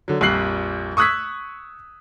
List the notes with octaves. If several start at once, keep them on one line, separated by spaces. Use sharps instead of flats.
D3 F#3
A#1 F2 G3 F#6 C7 F#7
C#6 D#6 E6 F#6 G#6 B6